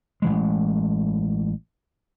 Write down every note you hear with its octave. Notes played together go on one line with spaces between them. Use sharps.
A1 E3 G#3